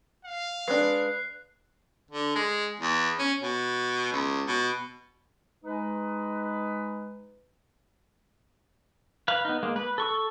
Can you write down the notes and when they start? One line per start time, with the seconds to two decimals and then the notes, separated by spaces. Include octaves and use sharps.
0.25 F5
0.68 G#3 D4 B4 F#6 C7
2.11 D3
2.35 G#3
2.80 E2
3.19 C#4
3.41 B2
4.12 C#2
4.47 B2
5.64 G#3 D#4 B4
9.28 B4 F5
9.45 B3 D#4
9.63 G#3 A#3
9.76 B4
9.98 A4 C#6 E6